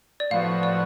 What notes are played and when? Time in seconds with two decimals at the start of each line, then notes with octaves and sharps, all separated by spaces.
0.20 D5
0.31 A2 F3 B3 F#4 F5
0.63 D5